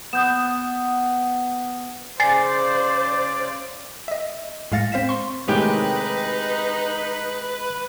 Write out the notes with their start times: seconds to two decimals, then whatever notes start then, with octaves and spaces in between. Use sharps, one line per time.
0.13 B3 D#6 G6 E7
2.20 C#3 C5 D5 G#5 D6 A6 C7
4.08 D#5 E5
4.72 A2 G#3 F5 A6 A#6 C#7
4.92 C4 C5 F5 B6 E7
5.09 C6 C#6
5.48 A2 C3 D#3 G#3 D#4 G4 B4 G5